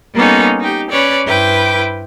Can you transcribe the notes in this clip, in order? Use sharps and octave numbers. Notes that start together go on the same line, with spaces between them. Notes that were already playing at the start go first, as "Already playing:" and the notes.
G3 A#3 B3 C#4 D#4 A4
D#4 G4
C#4 B4 C#5 D5
G2 E4 B4 C5 G5 D6